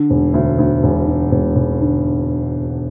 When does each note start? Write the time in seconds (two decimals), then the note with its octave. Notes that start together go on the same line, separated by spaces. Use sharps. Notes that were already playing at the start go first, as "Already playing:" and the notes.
Already playing: D3
0.10 E1
0.34 D2
0.59 D2
0.83 E1
1.07 D3
1.31 E1
1.55 E1
1.81 D3